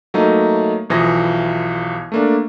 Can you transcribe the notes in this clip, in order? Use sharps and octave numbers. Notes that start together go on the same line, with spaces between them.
F#3 A3 A#3 D#4
B1 E3 F3 D#6 A#6
A3 A#3 D4